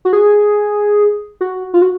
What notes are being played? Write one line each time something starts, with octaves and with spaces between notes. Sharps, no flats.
F#4
G#4
F#4
F4
F#4